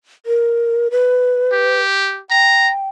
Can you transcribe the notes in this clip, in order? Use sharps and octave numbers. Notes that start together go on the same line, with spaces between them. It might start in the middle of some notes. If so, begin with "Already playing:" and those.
A#4
B4
G4
G5 A#5